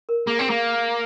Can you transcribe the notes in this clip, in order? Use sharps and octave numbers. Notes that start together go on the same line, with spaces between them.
A#4
A#3 G#4
C4
A#3